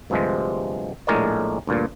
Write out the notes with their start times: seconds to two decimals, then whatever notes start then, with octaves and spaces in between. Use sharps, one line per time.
0.10 D2 G2 C3 F3 G#3
1.07 A#1 A2 G#3 A#4 C#5 D5
1.67 D2 G2 A#2